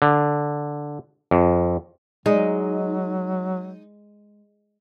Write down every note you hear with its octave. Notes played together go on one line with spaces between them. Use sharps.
D3
F2
F#3 G#3 D#4